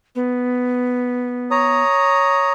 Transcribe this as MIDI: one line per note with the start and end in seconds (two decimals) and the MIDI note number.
0.15 1.83 59
1.51 2.53 73
1.51 2.53 82
1.51 2.53 87